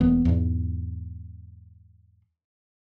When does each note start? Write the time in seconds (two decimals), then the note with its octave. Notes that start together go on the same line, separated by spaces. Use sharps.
0.01 E1 E3 A#3 B3
0.25 E2 G#2